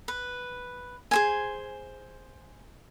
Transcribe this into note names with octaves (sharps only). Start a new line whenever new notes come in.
B4
G#4 C5 G#5